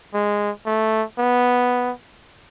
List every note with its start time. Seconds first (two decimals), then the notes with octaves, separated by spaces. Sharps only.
0.14 G#3
0.66 A3
1.18 B3